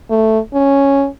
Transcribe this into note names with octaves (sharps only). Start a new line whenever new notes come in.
A3
C#4